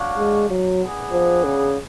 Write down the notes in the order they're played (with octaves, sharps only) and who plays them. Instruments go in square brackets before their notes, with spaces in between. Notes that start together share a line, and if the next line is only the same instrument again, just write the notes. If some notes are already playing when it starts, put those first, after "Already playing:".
Already playing: [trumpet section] D4 F#4 C#5 F5
[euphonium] G#3
F#3
[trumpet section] B3 D4 G#4
[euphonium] F3
C#3